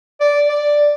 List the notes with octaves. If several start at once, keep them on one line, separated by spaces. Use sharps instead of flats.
D5
D5